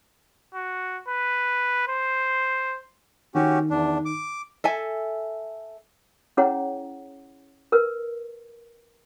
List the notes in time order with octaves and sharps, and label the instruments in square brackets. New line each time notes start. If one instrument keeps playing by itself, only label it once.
[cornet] F#4
B4
C5
[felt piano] D#3 [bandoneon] C#4 F#4 G4
[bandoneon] E2 D4
D6
[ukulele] A4 E5 G#5
[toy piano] C#4 E4 G#4 C#5 F#5 A#5
A#4 B4